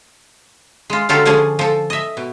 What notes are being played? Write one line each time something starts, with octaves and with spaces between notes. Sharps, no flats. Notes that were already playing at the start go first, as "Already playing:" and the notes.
G#3 F4
D3 F#3 F4 G4 A4
D3 F3 C#4 D4 G#4
F3 A4
D#5 E5
B2